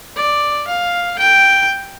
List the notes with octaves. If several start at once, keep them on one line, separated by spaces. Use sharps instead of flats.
D5
F5
G5